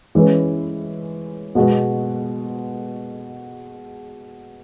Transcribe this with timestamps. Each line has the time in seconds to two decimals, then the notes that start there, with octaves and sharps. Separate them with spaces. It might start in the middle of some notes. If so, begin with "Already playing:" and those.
0.15 E3 G#3 C#4 E4 B4
1.55 B2 G#3 B3 F#4